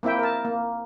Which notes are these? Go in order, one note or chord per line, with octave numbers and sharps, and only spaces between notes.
A#3 C4 E4 E5 G5
A#4 A5
A#3